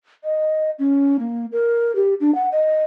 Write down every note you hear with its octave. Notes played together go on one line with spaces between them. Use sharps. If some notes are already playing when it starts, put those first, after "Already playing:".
D#5
C#4
A#3
A#4
G4
D4
F#5
D#5